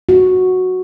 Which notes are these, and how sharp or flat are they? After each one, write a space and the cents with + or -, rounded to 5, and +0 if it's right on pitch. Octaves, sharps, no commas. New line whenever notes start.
F#4 -5